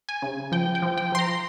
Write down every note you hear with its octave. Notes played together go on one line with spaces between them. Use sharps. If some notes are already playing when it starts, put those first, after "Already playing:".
G#5
C#3
F3 G5
G5
F3
G5
F3 C6
A#5